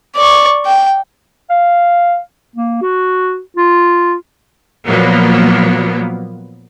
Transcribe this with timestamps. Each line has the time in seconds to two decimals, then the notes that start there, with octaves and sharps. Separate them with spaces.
0.15 D5 C#6
0.66 G5
1.50 F5
2.56 A#3
2.82 F#4
3.57 F4
4.86 A#2 F3 F#3 A#3 B3